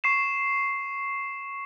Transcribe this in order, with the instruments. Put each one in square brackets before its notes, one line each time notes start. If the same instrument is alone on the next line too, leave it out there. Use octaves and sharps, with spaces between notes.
[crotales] C#6 C7 E7